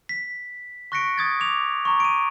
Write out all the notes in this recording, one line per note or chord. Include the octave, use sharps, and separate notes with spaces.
B6
C#6 F#6 A#6 B6 C#7 D7
D#6 G#6 A6
D6 F7
A#5 C#6
D7 D#7